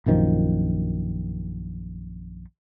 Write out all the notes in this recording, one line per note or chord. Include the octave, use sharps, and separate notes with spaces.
A#1 F#2 D#3 F3